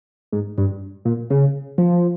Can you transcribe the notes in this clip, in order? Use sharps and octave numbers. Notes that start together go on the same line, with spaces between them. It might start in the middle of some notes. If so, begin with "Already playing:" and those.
G#2
G2
A#2
C#3
F3